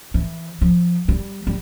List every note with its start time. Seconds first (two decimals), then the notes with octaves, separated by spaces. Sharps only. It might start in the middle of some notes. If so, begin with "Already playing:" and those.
0.14 E3
0.61 F3
1.08 G3
1.47 G3